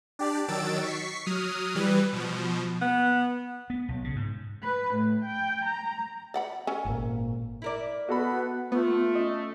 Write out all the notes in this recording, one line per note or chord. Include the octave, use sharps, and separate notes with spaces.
D4 G4 D5
D#3 F#3 E6 A6 D7
C#6 B6 C7
F#3 D#6 F6
E3 G3 B4
B2 F3
B3
B3
B1
C#3
G#2
B4
A2
G5
A#5
D5 F#5 B5
C#4 A4 G#5
G#1 A#2
E4 A#4 D5
B3 F#4 A4 B5
A3 B3 F4
C#4 D#5